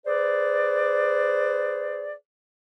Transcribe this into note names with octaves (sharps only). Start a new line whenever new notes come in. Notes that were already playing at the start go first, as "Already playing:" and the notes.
G#4 B4 C5 D5